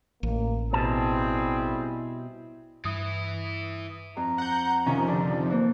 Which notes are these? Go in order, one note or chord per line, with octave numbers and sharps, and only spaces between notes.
A1 A#3
B2 G3 C4 E4 G#4 A5
G2 E3 E4 D#6
F2 A#5
F#5 G6
C3 D#3 F3 C#4
D3 D5
E3 A#3 C5